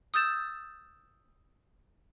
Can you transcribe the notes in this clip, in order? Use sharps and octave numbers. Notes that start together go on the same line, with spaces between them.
D#6 E6 G6 A6 E7